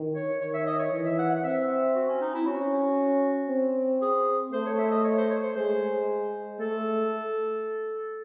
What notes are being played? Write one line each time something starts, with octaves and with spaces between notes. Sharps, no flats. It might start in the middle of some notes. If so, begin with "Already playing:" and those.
Already playing: D#3
C#5
D#3 C#5
E5
D#5
C#5
E3
E5
F#5
F#5
C4 E5
F#4
C#4
D#4
E4
C#4 F#4
C4
G#4
A3 C5
C#5
E5
D#5
C#5
C5
C#5
C5
G#3 C5
A3 A4